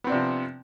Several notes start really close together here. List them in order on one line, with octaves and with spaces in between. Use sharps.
B3 C4 D4 C3 F3